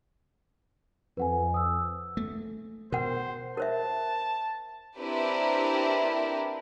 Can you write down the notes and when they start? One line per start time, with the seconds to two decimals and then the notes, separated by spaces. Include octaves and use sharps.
1.17 F2 B4 F#5 G#5
1.54 D#6 E6
2.17 A3
2.92 B2 A#4 C5 F#5
3.57 A#4 C5 E5 A5
4.99 C4 D4 E4 G4 A#4 B4